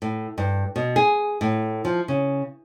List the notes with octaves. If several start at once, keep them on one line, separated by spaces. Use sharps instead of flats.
A2
G2
B2
G#4
A2
F3
C#3